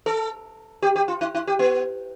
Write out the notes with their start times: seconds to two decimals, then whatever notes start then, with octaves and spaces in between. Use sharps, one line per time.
0.06 A4
0.82 G4
0.96 G4
1.08 F4
1.21 E4
1.35 E4
1.47 G4
1.59 B3